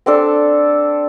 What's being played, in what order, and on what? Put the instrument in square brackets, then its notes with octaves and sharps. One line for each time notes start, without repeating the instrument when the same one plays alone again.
[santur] C4 D4 A4